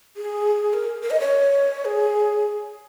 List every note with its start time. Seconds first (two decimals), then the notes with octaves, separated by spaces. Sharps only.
0.17 G#4
0.73 A#4
1.02 A#4
1.11 D#5
1.20 C#5
1.85 G#4